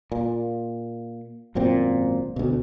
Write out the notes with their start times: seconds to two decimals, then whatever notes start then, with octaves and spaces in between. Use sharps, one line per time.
0.12 A#2
1.55 G#1 F#2 A#2 C4
2.36 D2 B2